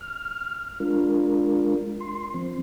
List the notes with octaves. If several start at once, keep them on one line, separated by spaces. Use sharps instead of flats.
F6
G#3 D4 F4 A#4
C6
F3 C4